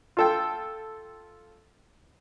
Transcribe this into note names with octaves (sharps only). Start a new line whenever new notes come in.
F4 A4 G5